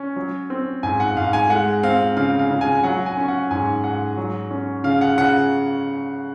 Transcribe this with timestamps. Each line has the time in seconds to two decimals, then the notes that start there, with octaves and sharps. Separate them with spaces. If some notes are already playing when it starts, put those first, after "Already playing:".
Already playing: C#4
0.16 F#3
0.50 C4
0.83 G#2 G#5
1.00 F#5
1.16 G#2 F5
1.33 G#5
1.50 G#3 F#5
1.83 C4 F5
2.17 C#3 F5
2.39 F5
2.50 C#3
2.61 G#5
2.84 F#3 F#5
3.06 G#5
3.17 C#4
3.28 F#5
3.51 G#2 G#5
3.84 G#2 F#5
4.17 F#3
4.51 C#4
4.84 C#3 F5
5.01 F#5
5.17 C#3 F#5